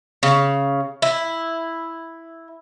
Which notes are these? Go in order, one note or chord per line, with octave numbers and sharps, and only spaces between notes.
C#3
E4